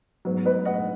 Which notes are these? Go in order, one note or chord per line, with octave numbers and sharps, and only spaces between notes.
G#2 F#3 B3 D#4
B4 D#5
D#5 F#5